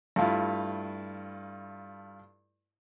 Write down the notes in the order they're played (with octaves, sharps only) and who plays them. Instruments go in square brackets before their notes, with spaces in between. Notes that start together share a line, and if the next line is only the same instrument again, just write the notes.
[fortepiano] G2 A3 E4 F4